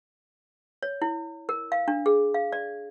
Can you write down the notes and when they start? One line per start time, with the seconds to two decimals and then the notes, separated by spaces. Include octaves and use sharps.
0.83 C#5
1.02 E4
1.49 A#4
1.72 F5
1.88 D4
2.06 G#4
2.34 F5
2.52 D5